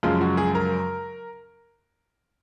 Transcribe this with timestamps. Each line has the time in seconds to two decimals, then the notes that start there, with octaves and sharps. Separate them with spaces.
0.03 F#2 C#3 F3 G#3 F4
0.21 F#4
0.37 G#4
0.55 A#4